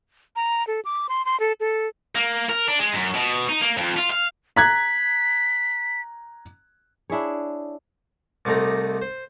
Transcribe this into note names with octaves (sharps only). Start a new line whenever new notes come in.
A#5
A4
D6
C6
C6
A4
A4
A#3
A#4
D4
G#3
F#2
B2
D#4
A#3
F2
F4
F5
A#5 F#6 G#6 B6
D4 E4 G#4 C#5
C2 C3 A3 D#4 A#5
C5